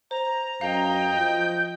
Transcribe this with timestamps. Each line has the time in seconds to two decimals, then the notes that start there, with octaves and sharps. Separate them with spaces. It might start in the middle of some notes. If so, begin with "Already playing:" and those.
0.11 C5 A#5
0.61 F#2 D#5 F5 G5
1.16 F3 G6